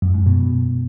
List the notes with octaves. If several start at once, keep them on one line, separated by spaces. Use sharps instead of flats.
F#2
G#2
B2